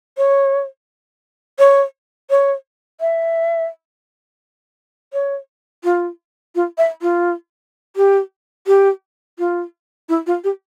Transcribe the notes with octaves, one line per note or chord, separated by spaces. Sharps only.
C#5
C#5
C#5
E5
C#5
F4
F4
E5
F4
G4
G4
F4
E4
F4
G4